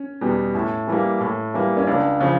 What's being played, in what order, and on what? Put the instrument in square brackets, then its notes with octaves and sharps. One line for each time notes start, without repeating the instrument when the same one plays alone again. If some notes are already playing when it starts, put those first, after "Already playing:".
Already playing: [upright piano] C#4
[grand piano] E2 B2 G3 B3
A2
E3 G3 A#3
A2
E3 G3 A#3
[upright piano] C#4
[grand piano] C#2 [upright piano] D4
[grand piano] C#3 F3